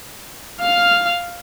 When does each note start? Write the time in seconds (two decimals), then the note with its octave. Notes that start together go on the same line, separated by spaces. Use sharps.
0.61 F5 F6